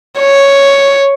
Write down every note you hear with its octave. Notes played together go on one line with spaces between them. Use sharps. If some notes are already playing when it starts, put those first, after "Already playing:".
C#5